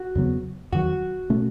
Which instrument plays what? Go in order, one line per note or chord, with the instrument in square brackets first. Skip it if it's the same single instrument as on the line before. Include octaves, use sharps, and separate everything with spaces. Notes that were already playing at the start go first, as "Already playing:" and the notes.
Already playing: [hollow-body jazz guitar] F#4
[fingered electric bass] E2 C#3 F#3 B3
[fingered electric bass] E2 D#3 F#3 [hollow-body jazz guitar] F#4
[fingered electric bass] B2 A3 C#4